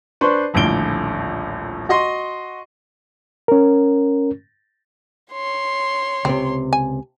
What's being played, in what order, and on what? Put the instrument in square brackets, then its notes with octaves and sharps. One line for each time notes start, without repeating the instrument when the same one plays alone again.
[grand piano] D4 B4 C5 C6 C#6
D#1 A#1 A2 D3 D7 G7
F#4 D#5 C6
[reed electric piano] C#4 A#4
[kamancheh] C#5 C6
[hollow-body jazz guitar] C#2 C3 [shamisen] C4
[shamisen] G#5